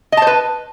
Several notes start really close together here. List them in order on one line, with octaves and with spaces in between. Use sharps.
D#5 A5 C5 B4